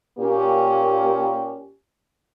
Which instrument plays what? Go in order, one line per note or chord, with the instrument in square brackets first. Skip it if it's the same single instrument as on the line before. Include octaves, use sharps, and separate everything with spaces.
[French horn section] A#2 A#3 C#4 G4